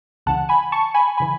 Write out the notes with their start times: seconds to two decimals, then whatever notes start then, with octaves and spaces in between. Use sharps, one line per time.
0.26 C#2 C#3 E3 F#5 A5
0.49 G#5 B5
0.72 A5 C#6
0.94 G#5 B5
1.18 C#3 E3 G#5 B5